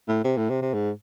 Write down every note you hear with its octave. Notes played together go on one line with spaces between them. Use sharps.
A2
C3
A2
C3
C3
G#2